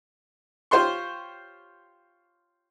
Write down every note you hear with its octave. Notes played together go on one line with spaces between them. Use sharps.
F4 G4 C5 C#5 C6 C#6